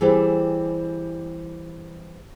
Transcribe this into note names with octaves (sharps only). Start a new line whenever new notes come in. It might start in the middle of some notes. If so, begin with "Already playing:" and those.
E3 G3 C4 G4 G#4 D5